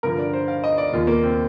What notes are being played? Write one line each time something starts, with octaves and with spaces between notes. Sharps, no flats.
G2 D3 F3 A#4
D5
C5
F5
D#5
D5
D#2 D#3 F4
A#3
C4